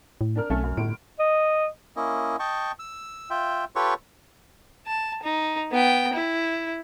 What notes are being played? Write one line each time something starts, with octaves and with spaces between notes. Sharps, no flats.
A2
D4 A#4 F6
B1 A3 C#4 A4
F#2
G1 A2 D7
D#5
A#3 C#4 E4 D#5
D#5 G5 A5 C#6
E6
F4 E5 G5
F4 G4 A4 B4 C#5 C#6
A5
D#4
B3 G5
E4